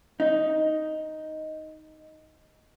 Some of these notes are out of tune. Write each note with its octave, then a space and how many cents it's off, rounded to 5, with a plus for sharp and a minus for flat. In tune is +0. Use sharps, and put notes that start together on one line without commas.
D#4 +5